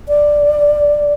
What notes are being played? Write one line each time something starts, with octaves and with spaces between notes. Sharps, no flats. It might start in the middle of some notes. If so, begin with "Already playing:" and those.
D5